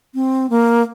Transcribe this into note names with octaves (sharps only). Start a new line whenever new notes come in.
C4
A#3